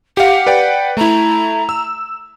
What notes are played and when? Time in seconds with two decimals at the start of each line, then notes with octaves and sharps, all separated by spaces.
0.17 G4 F5 F#5
0.47 B4 D5 G5
0.97 A3 E4 A#5
1.69 E6